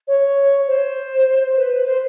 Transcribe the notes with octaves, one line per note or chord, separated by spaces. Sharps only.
C#5
C5
B4
C5